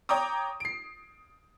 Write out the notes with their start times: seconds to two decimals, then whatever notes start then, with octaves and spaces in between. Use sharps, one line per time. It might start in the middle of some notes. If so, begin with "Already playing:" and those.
0.09 C#5 G5 A#5 D6 D#6
0.60 C7 D7